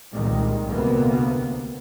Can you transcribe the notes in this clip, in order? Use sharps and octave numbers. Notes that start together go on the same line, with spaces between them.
C2 A#2 D#3 G3 G#3
D2 C3 A#3 B3